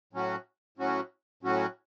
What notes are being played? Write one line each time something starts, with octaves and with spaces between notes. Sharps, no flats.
A2 F#3 C#4 F#4
A2 F#3 C#4 F#4
A2 F#3 C#4 F#4